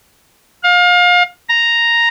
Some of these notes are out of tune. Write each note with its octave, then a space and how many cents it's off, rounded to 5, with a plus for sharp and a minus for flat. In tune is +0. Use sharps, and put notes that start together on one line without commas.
F5 +30
A#5 +0